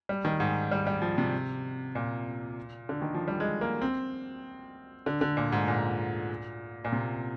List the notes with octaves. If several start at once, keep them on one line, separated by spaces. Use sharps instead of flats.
G3
D#3
G#2
G3
G3
F3
C3
A#2
D3
D#3
F3
G3
G#3
A#3
C4
D3
D3
A#2
G#2
A#2
A#2
C3